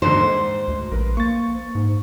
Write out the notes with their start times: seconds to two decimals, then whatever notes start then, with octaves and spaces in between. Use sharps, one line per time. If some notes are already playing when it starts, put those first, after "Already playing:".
0.02 D#2 G#2 D3 C5
0.25 G#2
0.68 D2
0.92 A#1 A#4 B4
1.17 A#3 C#6 A6
1.75 G#2